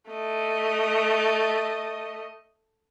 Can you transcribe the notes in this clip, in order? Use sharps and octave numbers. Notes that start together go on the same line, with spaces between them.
A3 D#5